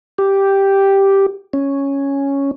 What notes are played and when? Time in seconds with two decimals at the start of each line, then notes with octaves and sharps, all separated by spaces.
0.18 G4
1.53 C#4